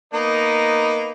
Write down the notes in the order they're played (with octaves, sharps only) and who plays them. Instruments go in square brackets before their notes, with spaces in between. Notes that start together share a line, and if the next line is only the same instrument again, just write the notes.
[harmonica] A#3 B3 D#4